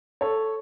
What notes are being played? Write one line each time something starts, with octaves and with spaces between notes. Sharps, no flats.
A4 C#5